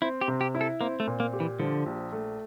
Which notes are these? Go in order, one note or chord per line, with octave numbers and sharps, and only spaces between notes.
C4 E4
G4
C3
G4
E4
A4
A#3 C4
A3
A#2
A#3
G4
E3
D3 F3
A#1
A3